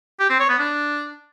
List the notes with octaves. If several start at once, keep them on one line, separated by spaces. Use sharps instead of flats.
G4
C4
C#5
B3
D4